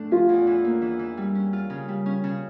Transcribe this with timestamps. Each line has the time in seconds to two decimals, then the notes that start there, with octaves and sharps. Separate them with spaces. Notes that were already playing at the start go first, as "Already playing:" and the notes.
Already playing: A2 A3 D4
0.11 C#4 F4
0.29 E2
0.47 E3
0.64 A#3
0.82 E3
0.99 E3
1.17 G3
1.35 C#4
1.53 F4
1.70 C#3
1.88 G3
2.06 C#4
2.24 C#3